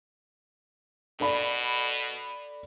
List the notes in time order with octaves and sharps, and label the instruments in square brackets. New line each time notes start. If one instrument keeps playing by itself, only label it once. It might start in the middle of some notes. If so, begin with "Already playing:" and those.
[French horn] B2 [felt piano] A4 D5 B5